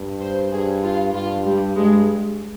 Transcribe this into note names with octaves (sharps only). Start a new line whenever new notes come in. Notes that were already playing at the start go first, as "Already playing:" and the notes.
Already playing: G2
C5
G2 G#4
F4
G2 F4
G3
G2 G#3